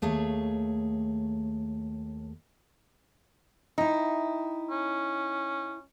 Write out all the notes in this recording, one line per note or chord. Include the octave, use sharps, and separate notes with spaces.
D#2 A3 G#4 C#5 F5
D#4 E4 G5
C#4